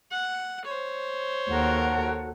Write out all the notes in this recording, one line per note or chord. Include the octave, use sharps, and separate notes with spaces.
F#5
C5 C#5
D#2 F#4 A4 A#4 F#5